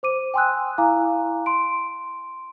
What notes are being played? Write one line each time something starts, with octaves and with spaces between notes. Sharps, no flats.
C5 D6 D#7
G5 G#5 C6 D#6 E6 F#6
E4 F5 G#5 A#5 D6
C6 D7